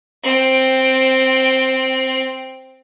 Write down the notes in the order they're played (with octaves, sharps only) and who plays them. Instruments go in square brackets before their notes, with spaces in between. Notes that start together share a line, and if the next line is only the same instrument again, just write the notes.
[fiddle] C4 G5